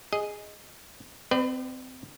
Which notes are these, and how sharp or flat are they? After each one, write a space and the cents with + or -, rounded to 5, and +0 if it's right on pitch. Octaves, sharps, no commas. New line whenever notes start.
G#4 +0 D#5 +0
C4 -25 B4 +25 D5 +40